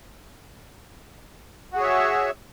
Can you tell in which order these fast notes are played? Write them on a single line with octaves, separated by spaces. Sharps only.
F#4 G#4 C#5 E5